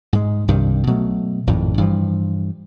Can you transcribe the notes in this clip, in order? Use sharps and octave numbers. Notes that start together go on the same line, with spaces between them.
G#2 G#3
C2 G2 C3 D#3
B2 F#3 A3
G#1 F2 A2
G2 E3 F3